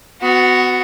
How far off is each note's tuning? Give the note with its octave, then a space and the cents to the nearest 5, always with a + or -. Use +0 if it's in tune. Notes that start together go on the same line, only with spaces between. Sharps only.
B3 +30 F#4 +0